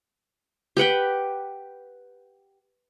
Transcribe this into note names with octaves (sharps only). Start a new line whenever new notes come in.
G4 B4 F#5 G5